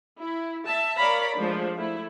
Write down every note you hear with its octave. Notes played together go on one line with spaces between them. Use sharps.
E4
E5 A5
A#4 C#5 D5 F5 A#5 B5
F3 G#3 A3 D4
A3 E4